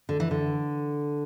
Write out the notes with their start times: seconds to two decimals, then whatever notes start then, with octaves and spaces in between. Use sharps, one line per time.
0.09 D3
0.20 E3
0.31 D3